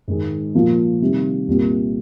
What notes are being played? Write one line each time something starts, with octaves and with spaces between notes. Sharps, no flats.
G#2 D#3 G#3
A#2 F3 A#3
C3 D#3 G3
C2 A#2 G3 A#3